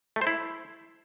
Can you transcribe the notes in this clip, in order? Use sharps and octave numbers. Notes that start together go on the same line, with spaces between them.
A3
C5
E4